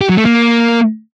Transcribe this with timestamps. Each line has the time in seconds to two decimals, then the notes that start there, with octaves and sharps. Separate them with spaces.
0.01 G4
0.09 F#3
0.17 A3
0.25 A#3